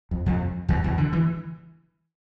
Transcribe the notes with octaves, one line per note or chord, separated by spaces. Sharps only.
F2
F2
E2
E2
D3
E3